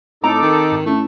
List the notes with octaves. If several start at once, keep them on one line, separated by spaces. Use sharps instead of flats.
A2 C4 D#4 A4 A#5 D6
D#3
G#2
A3 C#4 E4